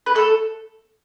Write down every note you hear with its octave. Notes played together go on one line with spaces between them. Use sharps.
B4
A3 A4